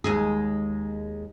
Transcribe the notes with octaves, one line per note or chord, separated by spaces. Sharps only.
D#2 G#3 G#4